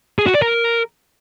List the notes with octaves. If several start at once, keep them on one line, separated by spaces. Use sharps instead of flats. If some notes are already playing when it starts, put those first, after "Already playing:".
G#4
F#4
D5
A#4